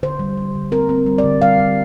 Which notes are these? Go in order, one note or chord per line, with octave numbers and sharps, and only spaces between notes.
D3 C5
G3
G3
D3
C4 A#4
C4
G3
D5
D3
G3 F5
G3